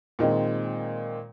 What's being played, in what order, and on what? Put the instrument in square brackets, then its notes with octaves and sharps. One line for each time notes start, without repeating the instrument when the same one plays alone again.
[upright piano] A#2 D#3 G#3 C4